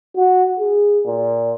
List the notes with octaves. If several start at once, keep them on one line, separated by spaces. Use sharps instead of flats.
F#4
G#4
A#2